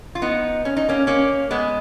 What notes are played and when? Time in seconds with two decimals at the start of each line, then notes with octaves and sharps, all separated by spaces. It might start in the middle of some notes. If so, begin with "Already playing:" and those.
0.15 F4
0.22 B3 D#4
0.65 C#4
0.77 D#4
0.89 A#3 C#4
1.07 A#3 C#4
1.51 G#3 B3